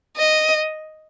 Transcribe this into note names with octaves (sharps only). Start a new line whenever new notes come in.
D#5